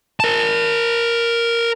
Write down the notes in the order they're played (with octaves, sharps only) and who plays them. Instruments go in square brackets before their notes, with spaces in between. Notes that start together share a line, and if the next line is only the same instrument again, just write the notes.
[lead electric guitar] A#4 A5